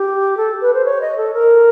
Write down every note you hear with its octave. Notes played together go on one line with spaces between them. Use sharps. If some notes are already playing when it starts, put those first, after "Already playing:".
Already playing: G4
A4
B4
C5
C#5
D#5
A4
A#4